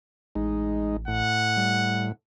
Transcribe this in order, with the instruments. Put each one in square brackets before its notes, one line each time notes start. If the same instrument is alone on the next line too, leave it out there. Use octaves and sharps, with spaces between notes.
[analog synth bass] A1 [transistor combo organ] G#3 D#4
[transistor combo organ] A2 [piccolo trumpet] F#5
[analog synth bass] G3